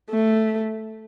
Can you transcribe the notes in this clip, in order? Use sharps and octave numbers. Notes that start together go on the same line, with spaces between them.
A3